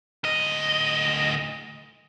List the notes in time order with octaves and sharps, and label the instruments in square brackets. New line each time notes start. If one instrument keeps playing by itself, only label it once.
[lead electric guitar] D2 D#5